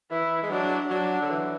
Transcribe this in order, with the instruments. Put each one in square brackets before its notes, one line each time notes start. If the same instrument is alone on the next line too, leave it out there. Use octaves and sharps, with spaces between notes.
[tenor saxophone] E3 [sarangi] E4
[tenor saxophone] G#3
[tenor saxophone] F#3 [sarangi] D4
[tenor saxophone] F#3 [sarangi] D4
[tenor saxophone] D3
E3